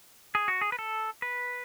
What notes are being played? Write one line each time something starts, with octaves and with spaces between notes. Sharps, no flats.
G#4
F#4
G#4
B4
A4
B4